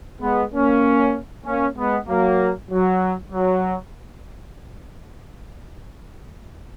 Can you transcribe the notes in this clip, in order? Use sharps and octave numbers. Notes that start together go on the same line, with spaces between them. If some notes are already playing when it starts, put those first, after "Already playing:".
G#3 B3
A#3 C#4
A#3 C#4
G#3 B3
F#3 A#3
F#3
F#3